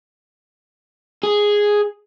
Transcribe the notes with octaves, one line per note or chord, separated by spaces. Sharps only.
G#4